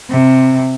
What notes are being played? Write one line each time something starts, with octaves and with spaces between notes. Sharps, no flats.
C3